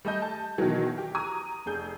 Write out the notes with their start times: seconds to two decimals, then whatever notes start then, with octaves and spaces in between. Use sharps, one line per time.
0.05 G3 A3 D#5 G6
0.22 A5
0.58 B2 D#3 E3 F#3
0.98 G4
1.15 A#5 D#6 G#6
1.66 F1 G#4 G6